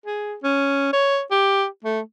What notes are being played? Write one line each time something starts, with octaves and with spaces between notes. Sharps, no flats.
G#4
C#4
C#5
G4
A3